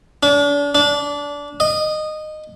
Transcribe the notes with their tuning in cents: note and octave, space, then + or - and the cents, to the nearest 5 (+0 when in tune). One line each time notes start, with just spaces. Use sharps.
D4 -35
D4 -20
D#5 -15